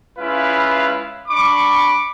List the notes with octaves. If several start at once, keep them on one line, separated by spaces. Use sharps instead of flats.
G#3 C#4 E4 F4 B4 F5
D4 B5 C#6 D6